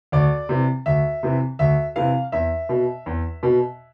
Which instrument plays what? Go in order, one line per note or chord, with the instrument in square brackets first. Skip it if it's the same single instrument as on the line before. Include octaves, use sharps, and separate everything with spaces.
[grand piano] D2 D5
C3 E3
D2 E5
C3 E3
D2 E5
C3 E3 F5
E2 E5
B2
E2
B2